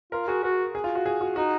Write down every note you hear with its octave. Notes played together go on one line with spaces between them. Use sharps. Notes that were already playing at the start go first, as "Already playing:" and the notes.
F4 A#4
F#4 G#4
F#4 A#4
G#4
F4
F#4
G#4
F#4
D#4 F#4